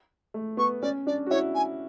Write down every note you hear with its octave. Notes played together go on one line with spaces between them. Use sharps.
A3
B3 C#6
C#4 D5
D4 D5
F#4
E4 C#5
G#5